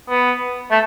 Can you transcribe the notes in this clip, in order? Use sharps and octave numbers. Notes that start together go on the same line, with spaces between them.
B3
A3